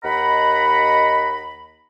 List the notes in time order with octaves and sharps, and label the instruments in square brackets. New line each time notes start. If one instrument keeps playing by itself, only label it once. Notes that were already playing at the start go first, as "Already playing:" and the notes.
[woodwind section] D#2 D#5 F#5 A#5 B5